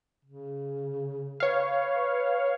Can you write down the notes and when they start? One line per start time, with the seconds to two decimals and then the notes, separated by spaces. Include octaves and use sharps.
0.25 C#3
1.40 B4 C#5 F5